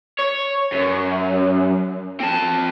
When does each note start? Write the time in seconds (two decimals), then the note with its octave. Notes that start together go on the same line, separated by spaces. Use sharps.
0.19 C#5
0.72 F#2
2.20 C4 A5